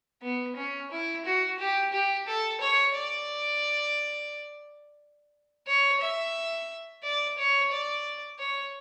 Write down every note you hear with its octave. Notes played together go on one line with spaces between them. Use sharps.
B3
C#4
E4
F#4
G4
G4
A4
C#5
D5
C#5
E5
D5
C#5
D5
C#5